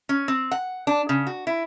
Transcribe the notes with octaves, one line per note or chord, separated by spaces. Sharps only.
C#4
C4
F#5
D4
C#3
F#4
E4